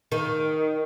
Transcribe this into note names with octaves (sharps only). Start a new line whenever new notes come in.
D#3